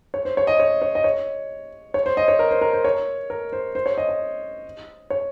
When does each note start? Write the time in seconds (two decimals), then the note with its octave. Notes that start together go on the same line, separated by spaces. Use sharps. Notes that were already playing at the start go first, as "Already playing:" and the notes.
0.14 C#5
0.25 C5
0.37 C#5
0.47 D#5
0.60 C#5
0.82 C#5
0.95 D#5
1.04 C#5
1.94 C#5
2.06 C5
2.17 D#5
2.28 C#5
2.39 A#4
2.51 C5
2.61 A#4
2.73 C5
2.85 C#5
3.30 A#4
3.53 C5
3.75 C5
3.86 C#5
3.98 D#5
4.09 D#5
5.10 C#5